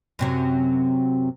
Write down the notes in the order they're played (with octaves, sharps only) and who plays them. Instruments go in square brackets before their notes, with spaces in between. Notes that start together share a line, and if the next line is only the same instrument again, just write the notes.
[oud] F#2 C3 F#3